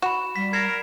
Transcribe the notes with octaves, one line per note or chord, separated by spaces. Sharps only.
F#4 B5 E7
G3 B6
A#4 G#6 C7 E7